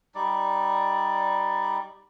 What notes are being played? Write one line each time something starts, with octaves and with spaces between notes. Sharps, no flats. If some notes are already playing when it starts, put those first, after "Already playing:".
G3 D#4 D5